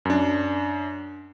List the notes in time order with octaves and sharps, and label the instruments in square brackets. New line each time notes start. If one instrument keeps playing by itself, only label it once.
[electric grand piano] F#2 D4